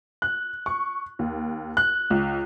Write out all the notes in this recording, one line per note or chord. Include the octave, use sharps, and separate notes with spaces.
F#6
C#6
D#2
F#6
C#2